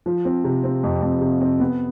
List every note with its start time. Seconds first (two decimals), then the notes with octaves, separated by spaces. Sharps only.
0.06 F3
0.25 C4
0.44 C3
0.64 C4
0.83 F2
1.02 F2
1.21 C3
1.41 C4
1.60 B3